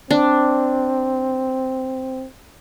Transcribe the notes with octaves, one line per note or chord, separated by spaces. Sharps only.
C4 D4